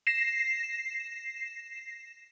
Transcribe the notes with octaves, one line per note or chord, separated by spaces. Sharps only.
A#6 C7 E7